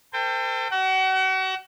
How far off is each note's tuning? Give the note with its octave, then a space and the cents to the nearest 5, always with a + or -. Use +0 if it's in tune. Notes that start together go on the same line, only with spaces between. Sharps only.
A4 +35 C5 -35 G5 +15
F#4 +35 F#5 +35